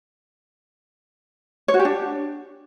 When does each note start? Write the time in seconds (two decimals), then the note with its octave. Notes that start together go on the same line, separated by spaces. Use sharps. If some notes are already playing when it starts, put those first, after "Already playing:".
1.68 C#5
1.74 F#4
1.79 G4
1.85 D4